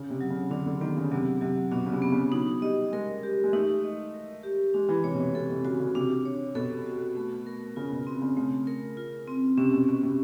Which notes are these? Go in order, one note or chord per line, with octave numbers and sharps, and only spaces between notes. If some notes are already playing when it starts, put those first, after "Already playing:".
Already playing: C#3
C3
F#3
C#3
D3 D4
D3
D#3 B3
C#3
C3 F#3
C3 F#3
B2 D4
C#3
C3
B3
C#3
F#3 D#4
G3 D#5
G#3 A#4
G4
G#3
A3 D#4
D#5
A#4
G4
G#3 D4
E3
C3 C#5
B2
C3
C3 A4
C3
C#3 F#4
C#3
C3 D4
C#5
B2 A4
F#4
A3
A#4
C#3 F4
B2
C4
C#3
C#3 A3
A#4
F4
C4
C3 C#4
B2
B2 C#4
C3